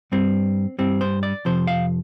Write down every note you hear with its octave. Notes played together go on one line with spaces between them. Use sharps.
G2 G3 C4
G2 G3 C4
C5
D5
F2 C3 F3 C5
F5